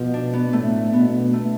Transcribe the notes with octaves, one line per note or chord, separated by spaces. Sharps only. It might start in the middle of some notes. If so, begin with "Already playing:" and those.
Already playing: B2 F3
D4
B3
A2 A3
B2 B3
A3